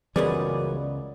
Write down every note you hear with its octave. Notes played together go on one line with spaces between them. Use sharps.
C#2 F#2 E3 G3 B3 G#4 D5